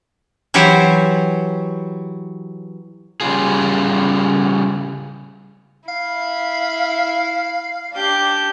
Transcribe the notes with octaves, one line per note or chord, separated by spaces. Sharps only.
E3 F#3 G4 C5 C#5
C#3 G3 F4 G#4
E4 F5
D4 G4 G6